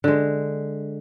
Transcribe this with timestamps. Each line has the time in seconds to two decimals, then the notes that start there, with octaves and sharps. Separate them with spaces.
0.04 D3 G#3